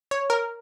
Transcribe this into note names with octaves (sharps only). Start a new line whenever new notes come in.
C#5
A#4